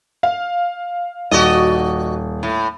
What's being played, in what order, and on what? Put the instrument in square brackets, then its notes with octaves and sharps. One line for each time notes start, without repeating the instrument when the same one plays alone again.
[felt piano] F5
[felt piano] D#1 [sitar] F#4 D5 D#5
[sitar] A2